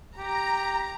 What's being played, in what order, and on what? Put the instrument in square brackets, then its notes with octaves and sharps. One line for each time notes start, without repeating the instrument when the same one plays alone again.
[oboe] G4 [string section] A#5